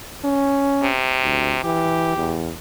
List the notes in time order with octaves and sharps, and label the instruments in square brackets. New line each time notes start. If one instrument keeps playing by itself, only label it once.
[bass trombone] C#4
[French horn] C3
[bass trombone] D2
[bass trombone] E3 [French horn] G4
[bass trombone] E2